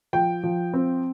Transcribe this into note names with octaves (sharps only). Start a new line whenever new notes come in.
F3 G5
F3
C4